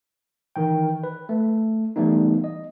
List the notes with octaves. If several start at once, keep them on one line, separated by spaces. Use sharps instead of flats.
D#3 E3 G5
B4
A3
E3 G3 A3 B3 D#4
D#5